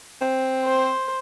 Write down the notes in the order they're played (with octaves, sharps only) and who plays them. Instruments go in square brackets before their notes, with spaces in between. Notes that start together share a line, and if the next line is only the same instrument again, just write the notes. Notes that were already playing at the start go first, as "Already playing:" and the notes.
[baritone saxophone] C4
[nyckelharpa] C5